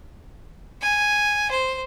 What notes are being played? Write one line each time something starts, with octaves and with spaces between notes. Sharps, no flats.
G#5
C5